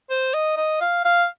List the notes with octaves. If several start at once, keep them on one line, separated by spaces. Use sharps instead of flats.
C5
D#5
D#5
F5
F5